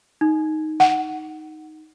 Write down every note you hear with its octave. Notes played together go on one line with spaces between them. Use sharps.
D#4
F#5